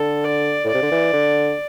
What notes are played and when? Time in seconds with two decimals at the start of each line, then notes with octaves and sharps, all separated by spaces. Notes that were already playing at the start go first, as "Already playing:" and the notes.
Already playing: D3 A4
0.24 D5
0.64 A2
0.69 C3 D5
0.82 D3
0.92 E3
1.13 D3